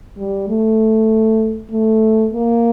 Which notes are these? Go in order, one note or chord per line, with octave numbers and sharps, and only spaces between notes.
G3
A3
A3
A#3